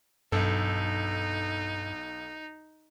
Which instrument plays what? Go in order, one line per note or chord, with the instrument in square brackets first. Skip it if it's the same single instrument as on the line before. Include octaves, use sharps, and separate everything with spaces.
[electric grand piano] B1 A4 [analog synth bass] G2 [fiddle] D#4